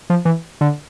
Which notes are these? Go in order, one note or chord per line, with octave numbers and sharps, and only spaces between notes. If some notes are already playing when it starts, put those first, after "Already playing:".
F3
E3
D3